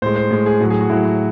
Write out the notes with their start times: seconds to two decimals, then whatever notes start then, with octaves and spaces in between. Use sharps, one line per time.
0.02 A2 G#3 C5
0.16 C5
0.31 A2 G#3
0.46 G#4
0.60 A2 F#3 F#4
0.70 G#4
0.81 F#4
0.89 A2 F#3 E4
1.05 F#4